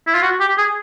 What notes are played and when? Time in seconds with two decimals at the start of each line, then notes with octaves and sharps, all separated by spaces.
0.07 E4
0.14 F4
0.22 F#4
0.40 G4
0.58 G#4